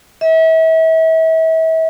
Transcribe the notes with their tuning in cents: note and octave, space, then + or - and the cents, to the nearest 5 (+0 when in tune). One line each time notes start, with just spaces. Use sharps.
E5 -35